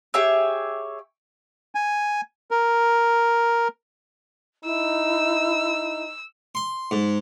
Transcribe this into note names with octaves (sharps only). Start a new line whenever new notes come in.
G4 G#4 C#5 E5
G#5
A#4
D#4 E4 E6
C6
G#2